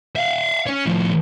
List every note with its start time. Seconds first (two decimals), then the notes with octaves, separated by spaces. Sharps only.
0.16 E5 F5
0.66 C#4 C#5
0.86 A2 F3